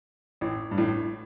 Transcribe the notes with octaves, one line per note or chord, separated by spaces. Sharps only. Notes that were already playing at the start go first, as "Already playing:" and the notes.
A1 A2
G2
A1 A2